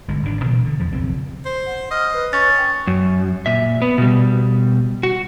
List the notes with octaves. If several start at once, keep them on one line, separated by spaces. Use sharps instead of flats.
G1 D2 G#3
G#1 G#2 C#3 D4
A#2 E3 F#3 G#3
D3
E2 F3
B1 F2 C#3 C4
C5
F#5
D#5 F6
B4
C#4 C#6 A6
G5
F#2
A#2 E5
B3
B2 G3
F#4